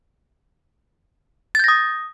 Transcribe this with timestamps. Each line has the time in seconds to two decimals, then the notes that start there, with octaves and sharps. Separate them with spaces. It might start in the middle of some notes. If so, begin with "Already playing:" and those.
1.55 A6
1.59 G6
1.64 A#6
1.68 D#6